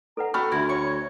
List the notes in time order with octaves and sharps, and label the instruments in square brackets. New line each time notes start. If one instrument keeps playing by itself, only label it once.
[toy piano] A4 B4 F#5 [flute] A#5
[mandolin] A3 F6 [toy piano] C#4 B5 C#6 [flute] F#4
[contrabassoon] D2 [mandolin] E4 [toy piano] E5
[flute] C#5 [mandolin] C#6